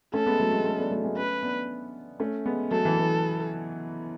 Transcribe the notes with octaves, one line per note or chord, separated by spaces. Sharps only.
A3 C#4 A4
G#3 B3
F#3 A3
G#3 B3
A3 C#4
B3 D4
F#3 A3
G#3 B3
A3 C#4 B4
B3 D4
A3 C#4
G#3 B3
F#3 A3 A4
E3
E3